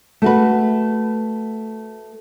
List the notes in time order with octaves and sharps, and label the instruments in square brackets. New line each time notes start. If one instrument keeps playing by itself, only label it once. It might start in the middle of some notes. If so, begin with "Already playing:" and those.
[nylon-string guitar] A3 F#4 B4